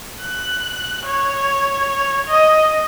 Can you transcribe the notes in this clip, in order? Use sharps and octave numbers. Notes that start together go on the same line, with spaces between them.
F#6
C#5
D#5